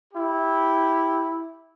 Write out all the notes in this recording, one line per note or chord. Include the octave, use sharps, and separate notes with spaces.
E4 G4